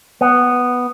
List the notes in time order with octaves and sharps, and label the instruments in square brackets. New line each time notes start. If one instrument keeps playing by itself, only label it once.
[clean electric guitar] B3